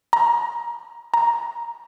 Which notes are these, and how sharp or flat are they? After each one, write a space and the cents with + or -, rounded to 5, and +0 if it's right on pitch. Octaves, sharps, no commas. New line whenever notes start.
A#5 +25
A#5 +10